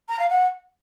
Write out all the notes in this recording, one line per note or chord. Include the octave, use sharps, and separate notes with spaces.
A#5
F5
F#5